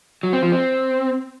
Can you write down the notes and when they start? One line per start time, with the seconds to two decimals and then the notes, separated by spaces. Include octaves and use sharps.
0.23 F#3
0.33 C4
0.42 F3
0.52 C4